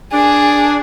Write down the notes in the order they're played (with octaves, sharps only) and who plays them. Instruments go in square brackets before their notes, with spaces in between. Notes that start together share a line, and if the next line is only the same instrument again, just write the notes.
[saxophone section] D4 [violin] G#4